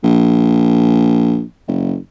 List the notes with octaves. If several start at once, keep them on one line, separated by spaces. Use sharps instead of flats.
A#1
F#1